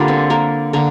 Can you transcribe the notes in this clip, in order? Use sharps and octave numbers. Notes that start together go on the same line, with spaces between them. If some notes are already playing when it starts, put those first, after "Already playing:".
Already playing: D3 G3 A#3 D4 F4
C4
A#3 A#4
D3 A#3